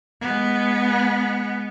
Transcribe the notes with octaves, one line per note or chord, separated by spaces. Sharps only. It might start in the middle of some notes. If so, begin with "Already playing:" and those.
G#3 B3